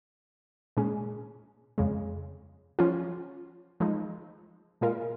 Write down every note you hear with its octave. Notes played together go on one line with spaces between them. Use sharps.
A#2 G#3 C#4 G#4
F2 C#3 G#3
F3 C#4 F4
F3 G#3 D#4
A#2 G#3 F4 A#4